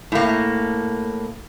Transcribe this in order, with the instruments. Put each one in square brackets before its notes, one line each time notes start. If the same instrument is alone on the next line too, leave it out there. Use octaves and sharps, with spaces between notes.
[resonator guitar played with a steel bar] A2 A#3